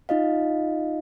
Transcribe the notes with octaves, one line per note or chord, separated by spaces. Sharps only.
D#4 F4 D#5 F5